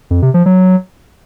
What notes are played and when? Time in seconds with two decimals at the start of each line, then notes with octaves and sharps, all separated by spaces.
0.11 F2
0.22 C3
0.34 F3
0.46 F#3